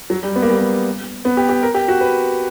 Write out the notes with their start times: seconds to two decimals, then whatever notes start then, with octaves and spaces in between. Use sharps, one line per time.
0.10 F#3
0.23 G3
0.36 B3
0.42 A#3
0.50 G3
0.57 A#3
1.25 B3
1.37 G4
1.49 G4
1.63 A#4
1.74 G4
1.88 F#4
2.01 B4